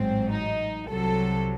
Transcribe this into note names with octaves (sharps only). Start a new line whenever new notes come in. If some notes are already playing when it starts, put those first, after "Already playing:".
Already playing: A1 G#2 F#3 C4
D#4
C2 C3 F#3 A4